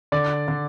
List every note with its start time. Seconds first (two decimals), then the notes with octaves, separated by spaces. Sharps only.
0.12 D3 D5
0.48 D3